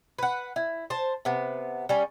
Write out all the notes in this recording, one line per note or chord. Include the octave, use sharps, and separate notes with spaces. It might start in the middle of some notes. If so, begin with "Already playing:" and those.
B4 F#5
E4
C5 A5
C3 B3
G3 C#4